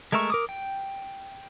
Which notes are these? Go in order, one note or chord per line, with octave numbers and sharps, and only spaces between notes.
G#3 A3 A#4 E5 C#6
A#4 D6 D#6
G5